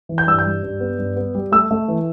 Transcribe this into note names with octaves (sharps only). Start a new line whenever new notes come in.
E3
G6
G2 E6
G6
G3
G2
B3
G2
B3
G3
A3 E6
A3
E3